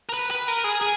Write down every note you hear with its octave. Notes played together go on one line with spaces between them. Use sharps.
A#4
B4
B4
A#4
G#4
G#4